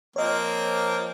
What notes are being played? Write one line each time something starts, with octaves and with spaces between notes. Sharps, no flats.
F3 A#3 C4 C#5 D#5